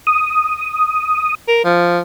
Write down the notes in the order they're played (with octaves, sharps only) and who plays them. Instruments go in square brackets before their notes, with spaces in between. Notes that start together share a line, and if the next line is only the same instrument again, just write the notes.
[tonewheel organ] D#6
[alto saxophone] A#4
F3